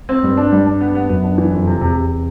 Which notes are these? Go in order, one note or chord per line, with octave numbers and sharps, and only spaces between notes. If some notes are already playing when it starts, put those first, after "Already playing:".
C4
G2 G3
D4
G3
D4
B3
B3
F#2 B3
D4
E3
F2
C3
E2 C3
C3